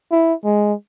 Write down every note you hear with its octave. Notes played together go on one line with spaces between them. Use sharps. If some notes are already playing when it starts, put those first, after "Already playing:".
E4
G#3